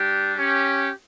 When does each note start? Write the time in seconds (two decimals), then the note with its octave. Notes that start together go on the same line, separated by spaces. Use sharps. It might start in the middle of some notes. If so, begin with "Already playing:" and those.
Already playing: G3 D4 G4
0.37 C#4 G4